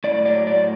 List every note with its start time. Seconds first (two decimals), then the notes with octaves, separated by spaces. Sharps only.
0.04 A2 D5
0.25 F#3 D5
0.47 A2 D5